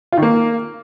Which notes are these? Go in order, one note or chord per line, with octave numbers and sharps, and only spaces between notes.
F4
D#3
A#3